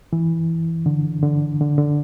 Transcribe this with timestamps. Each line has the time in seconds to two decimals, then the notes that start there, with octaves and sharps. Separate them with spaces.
0.13 E3
0.86 D3
1.23 D3
1.61 D3
1.78 D3